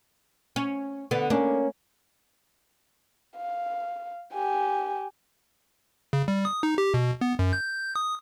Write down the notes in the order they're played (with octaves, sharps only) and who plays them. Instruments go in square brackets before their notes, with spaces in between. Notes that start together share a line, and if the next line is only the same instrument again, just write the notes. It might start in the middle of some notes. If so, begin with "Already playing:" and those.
[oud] C#4
D3 B3
[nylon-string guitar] A#3 C#4 [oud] D4
[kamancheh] F5
G4 G#5
[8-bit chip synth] C#3
G3
D#6
D#4
G4
B2
B3
F#2
G6
D#6